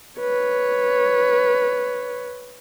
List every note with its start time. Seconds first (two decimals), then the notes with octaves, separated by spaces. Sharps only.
0.20 B4 C#5